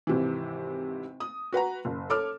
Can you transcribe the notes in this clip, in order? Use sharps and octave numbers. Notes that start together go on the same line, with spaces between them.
G#1 C3 E3
D#6
F#4 B4 F#5 A#5
F#1
A4 C#5 D6 F6